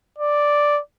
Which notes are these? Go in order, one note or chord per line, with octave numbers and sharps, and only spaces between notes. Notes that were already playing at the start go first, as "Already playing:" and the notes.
D5